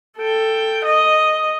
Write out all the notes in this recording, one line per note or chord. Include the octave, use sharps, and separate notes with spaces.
A4 G5
D#5